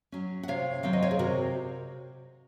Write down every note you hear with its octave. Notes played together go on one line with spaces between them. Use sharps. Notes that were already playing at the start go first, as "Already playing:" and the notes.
F#3 C#4
F#5
C3 C#5 F5
D#3 F#3 C4 F5
D#5
C#5 F5
G#4
C3 F#4 A#4